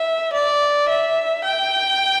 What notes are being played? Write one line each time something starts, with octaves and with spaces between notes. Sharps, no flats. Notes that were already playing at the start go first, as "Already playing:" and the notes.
Already playing: E5
D5
E5
G5